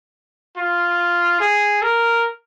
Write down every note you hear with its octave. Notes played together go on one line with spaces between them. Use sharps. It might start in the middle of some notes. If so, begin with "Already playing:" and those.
F4
G#4
A#4